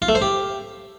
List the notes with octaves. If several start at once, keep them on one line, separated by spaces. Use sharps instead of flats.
F4
A3
C5
G4